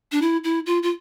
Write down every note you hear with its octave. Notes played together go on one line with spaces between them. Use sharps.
D4
E4
E4
F4
F4